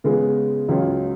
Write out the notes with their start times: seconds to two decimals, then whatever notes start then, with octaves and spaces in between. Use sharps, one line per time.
0.04 C#3 G#3 B3 F4 G#4
0.69 C#2 C#3 F#3 C#4 F4